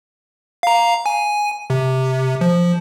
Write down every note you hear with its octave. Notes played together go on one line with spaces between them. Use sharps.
F5 A#5
G#5
C3
F3